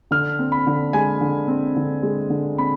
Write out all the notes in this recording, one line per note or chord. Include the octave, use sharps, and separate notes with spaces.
D3 F6
C4
B5
D3
G#3 G#5
D3
C4
D3
G#3
D3
C4 B5